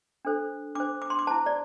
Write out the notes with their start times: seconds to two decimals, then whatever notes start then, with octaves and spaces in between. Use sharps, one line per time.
0.25 D4 A4 C5
0.75 D4 D6
0.80 C5
1.02 D6
1.10 C6
1.19 D6
1.27 C5 A5
1.31 E4
1.46 D5